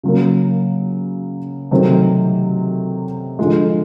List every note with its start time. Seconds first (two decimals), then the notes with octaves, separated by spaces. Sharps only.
0.03 C#3 F#3 A#3
1.71 C3 D#3 F#3 A3 C4
3.39 D3 F3 G#3